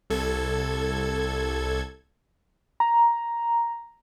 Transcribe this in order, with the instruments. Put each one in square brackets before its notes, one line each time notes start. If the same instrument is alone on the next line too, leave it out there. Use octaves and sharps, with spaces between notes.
[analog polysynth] C2 A4 G#6
[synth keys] A#5